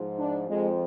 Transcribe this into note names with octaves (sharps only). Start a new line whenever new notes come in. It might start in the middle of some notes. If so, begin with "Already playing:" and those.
Already playing: G#2 F3
D4
F2 F3 G#3